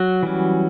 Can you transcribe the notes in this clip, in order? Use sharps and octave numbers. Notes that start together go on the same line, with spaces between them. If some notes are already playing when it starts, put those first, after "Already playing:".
Already playing: F#3 F#4
E3 G3 C#4